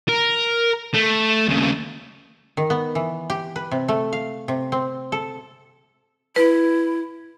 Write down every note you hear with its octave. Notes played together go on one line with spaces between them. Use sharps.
A#4
A3
D#2 C#3
D#3
B3
E3
G4
B4
C3
A3
F5
C3
C4
A4
E4 B4